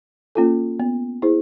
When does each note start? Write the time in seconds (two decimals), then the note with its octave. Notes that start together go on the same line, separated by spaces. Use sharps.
0.35 A#3 C#4 F4 A4
0.80 B3
1.22 E4 G#4 C5